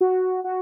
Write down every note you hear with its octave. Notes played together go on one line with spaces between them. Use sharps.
F#4
F#4